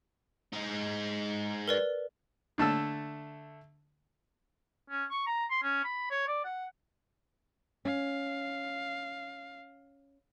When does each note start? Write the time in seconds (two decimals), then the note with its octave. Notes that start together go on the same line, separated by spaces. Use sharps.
0.53 G#3 D#4
1.68 A#4 B4 D5
2.58 D3 A3 A5 E6
4.90 C#4
5.11 C#6
5.26 A#5
5.50 C6
5.63 C#4
5.84 B5
6.11 C#5
6.28 D5
6.44 F#5
7.85 C#4 F5